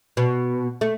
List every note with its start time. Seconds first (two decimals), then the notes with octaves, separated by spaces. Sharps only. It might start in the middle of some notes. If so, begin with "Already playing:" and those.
0.17 B2
0.81 A3